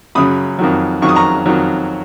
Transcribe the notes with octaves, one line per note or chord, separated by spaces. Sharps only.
F#2 C#3 F#3 B5 D#6
F2 D#3 F#3
F2 D#3 F#3 C#6
D#6
A#5 C#6
F2 D#3 F#3